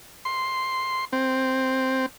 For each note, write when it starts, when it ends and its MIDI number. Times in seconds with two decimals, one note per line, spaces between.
0.25 1.05 84
1.13 2.06 60